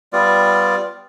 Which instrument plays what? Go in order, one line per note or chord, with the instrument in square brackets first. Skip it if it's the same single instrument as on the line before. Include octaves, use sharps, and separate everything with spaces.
[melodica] G3 B3 F4 D5